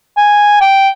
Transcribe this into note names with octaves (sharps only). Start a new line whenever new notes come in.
G#5
G5